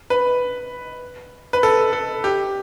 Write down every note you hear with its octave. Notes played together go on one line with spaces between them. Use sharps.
B4
B4
A4
A4
G4